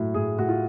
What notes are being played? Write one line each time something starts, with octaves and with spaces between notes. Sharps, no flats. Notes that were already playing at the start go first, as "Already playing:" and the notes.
Already playing: A2 F#3
A2 G#4
A2 F#4
F4